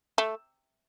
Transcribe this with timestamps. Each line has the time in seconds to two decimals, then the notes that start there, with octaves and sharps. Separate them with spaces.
0.18 A3